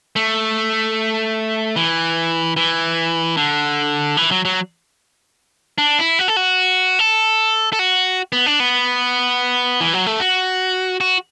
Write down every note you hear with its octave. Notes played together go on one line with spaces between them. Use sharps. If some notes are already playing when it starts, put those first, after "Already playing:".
A3
E3
E3
D3
E3
F#3
F#3
D4
E4
F#4
A4
F#4
A4
A4
F#4
B3
D4
B3
E3
F#3
A3
F#4
F#4